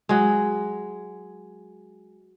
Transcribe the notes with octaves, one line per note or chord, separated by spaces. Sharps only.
F#3 G#3